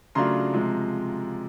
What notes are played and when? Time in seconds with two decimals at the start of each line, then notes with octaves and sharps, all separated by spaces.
0.15 C#3 F#3 A3 D4 F4 A#5 C6
0.54 C3 F3 G#3